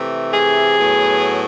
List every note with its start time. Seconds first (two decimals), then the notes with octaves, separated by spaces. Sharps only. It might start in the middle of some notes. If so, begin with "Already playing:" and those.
Already playing: C3 E3 A3
0.32 G#4
0.76 A2 F#3 B3